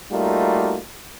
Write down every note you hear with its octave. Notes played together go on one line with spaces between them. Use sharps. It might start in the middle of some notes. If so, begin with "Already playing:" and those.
G3 A3 A#3 D#4 F4 F#4